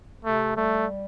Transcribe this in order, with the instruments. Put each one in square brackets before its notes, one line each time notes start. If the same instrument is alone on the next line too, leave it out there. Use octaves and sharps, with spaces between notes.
[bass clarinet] C3 [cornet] A3
[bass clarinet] G3 [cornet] A3